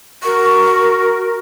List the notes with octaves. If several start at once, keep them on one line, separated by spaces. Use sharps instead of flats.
F#4 A#4 C#6